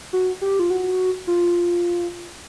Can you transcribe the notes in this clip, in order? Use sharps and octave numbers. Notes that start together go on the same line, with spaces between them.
F#4
G4
F4
F#4
F4